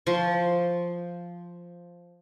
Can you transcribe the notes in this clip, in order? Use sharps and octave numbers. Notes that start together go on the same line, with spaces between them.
F3 C6 C#6